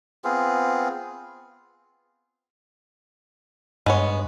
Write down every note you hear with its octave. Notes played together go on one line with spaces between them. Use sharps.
B3 C4 F4 G#4
G2 G#3 B3 C#5